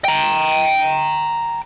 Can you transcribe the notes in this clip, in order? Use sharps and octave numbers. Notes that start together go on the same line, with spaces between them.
G5 A#5